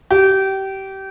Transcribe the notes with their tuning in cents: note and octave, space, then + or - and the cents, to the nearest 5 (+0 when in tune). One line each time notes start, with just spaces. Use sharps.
G4 -25